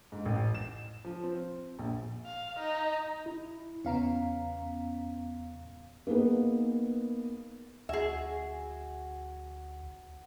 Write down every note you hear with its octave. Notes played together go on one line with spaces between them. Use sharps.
G#2
A1
E7
F3
C4
A#1
F5
D#4
E4
E2 C#3 B3 C#4 F5 A#5
A#3 B3 D#4 G#4 B4
D2 F#4 G#4 E5 G#5